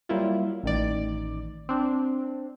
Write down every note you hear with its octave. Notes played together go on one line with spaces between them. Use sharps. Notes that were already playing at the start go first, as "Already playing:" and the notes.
F#3 G3 A#3 E4 F4
A1 D#3 D5
C4 D4